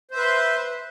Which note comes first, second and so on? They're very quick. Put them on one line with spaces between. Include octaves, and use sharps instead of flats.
C5 E5 B4 C6